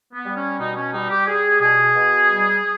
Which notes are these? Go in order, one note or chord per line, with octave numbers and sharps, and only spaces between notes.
B3
G3
C#4
B2 D#4
C#4
G3 D#4
G4
G3 G#4
B2 G#4
B2
G3